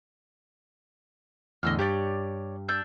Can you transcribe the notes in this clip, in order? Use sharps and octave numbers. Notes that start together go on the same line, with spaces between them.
E2 A2 D3 D#5 E6 F6
G2 G4 C#5 D5
D4 E6 G6